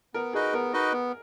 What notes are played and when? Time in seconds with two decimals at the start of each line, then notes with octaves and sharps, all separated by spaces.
0.14 B3 A#4
0.33 D#4 F#4 G#4 B4 D#5
0.53 B3 A#4
0.73 D#4 F#4 B4 D#5
0.93 B3